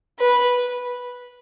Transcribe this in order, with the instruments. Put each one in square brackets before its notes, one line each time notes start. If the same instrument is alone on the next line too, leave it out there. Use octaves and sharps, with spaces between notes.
[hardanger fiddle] B4